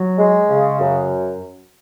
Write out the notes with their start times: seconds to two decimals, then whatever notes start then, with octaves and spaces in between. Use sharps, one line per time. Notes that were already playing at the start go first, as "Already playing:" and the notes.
Already playing: F#3
0.18 G#3
0.49 C#3
0.80 F#2